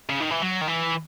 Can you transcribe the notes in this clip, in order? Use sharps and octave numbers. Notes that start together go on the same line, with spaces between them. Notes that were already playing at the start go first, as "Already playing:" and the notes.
C#3
D#3
E3
F#3
D#3
E3